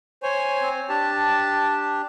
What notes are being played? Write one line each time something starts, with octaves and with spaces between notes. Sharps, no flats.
C5 C#5 G#5
C4
D4 G4 A5